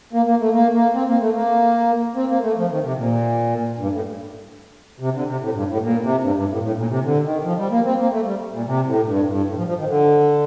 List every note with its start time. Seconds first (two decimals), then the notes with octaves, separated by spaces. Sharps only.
0.13 A#3
0.26 A#3
0.40 A3
0.53 A#3
0.73 A#3
0.94 C4
1.07 A#3
1.21 A3
1.35 A#3
2.16 C4
2.29 A#3
2.43 A3
2.57 F3
2.70 D#3
2.83 C3
2.97 A#2
3.79 G2
3.91 A2
5.00 C3
5.14 D3
5.27 C3
5.41 A2
5.54 G2
5.68 A2
5.82 A#2
6.02 C3
6.22 G2
6.36 G2
6.49 A2
6.62 A2
6.77 A#2
6.90 C3
7.04 D3
7.23 D#3
7.44 F3
7.58 G3
7.71 A#3
7.85 C4
7.99 A#3
8.12 A3
8.25 G3
8.52 A#2
8.66 C3
8.87 A2
9.06 G2
9.27 G2
9.47 A2
9.57 F3
9.67 F3
9.78 D#3
9.88 D3